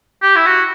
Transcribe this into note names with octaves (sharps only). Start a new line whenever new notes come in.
G4
E4
F#4